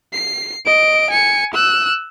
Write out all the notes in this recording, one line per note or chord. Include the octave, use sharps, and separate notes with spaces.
C7
D#5 D7
G#5 C#7
E6 F#6